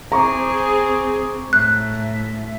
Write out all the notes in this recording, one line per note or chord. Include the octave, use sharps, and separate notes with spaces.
C4 G#4 A#5 C#6 D6
A2 E5 F#6